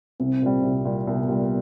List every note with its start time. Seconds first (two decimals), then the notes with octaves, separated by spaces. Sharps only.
0.20 C2 C4
0.42 A#2 G3
0.63 C2
0.85 A#2 G3
1.06 C2 B3
1.29 A#2 G3